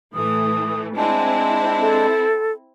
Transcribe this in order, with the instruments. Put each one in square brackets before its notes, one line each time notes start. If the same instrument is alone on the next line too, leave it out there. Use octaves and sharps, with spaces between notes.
[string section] A2 E3 A3 [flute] D#6
[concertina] G#3 D4 [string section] C4 E4 [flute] G#5
[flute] A4